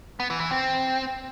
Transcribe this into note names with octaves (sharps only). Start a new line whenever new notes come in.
B3
E3
E3
C4